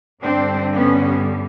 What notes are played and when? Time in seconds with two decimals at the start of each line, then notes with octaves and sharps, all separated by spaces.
0.22 G2 D3 G3 C4 D4
0.74 B3 C#4